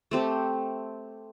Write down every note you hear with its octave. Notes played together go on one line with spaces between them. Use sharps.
A3 C4 G4